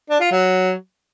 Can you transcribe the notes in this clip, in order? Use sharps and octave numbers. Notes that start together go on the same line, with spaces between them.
D4
F4
F#3